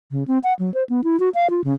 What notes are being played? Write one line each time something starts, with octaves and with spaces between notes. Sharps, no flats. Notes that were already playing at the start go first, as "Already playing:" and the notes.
C#3
C4
F#5
F#3
C5
B3
E4
F#4
F5
F4
C#3